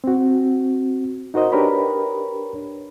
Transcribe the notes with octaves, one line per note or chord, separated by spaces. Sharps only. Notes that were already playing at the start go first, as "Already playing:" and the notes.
C4 F#4
D#4 F#4 A#4 C5 D#5
D4 G4 A#4 B4 C#5 B5